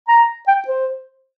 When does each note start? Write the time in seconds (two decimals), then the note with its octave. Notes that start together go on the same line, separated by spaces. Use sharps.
0.08 A#5
0.48 G5
0.68 C5